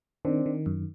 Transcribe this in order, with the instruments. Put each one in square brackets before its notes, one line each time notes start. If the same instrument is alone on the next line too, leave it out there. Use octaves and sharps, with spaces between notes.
[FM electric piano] D#3 [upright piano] C4 D4
[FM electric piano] D#3
F#2